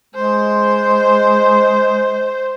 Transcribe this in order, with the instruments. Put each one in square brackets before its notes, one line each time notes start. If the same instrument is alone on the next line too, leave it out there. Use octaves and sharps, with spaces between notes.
[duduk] G#3 [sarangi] C5